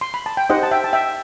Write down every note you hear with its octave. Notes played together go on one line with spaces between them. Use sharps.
C6
B5
A5
G5
D#4 G4 C5 D#5 F#5
A5
E5 G5
A5
E5 G5